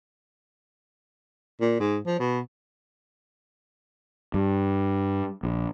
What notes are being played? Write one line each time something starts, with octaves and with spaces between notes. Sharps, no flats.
A#2
G#2
F3
B2
G2
A#1